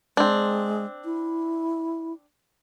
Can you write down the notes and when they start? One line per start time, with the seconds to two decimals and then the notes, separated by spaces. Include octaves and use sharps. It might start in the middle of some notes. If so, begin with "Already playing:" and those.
0.17 G#3 C4 D4
1.05 E4